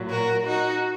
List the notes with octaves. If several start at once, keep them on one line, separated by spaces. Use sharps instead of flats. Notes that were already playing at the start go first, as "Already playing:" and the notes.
Already playing: A#2 F#3
F#4 A#4
D#4 F#4